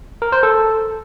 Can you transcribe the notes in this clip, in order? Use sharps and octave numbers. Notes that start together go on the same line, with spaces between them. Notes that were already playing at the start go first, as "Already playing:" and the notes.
A#4
C5
A4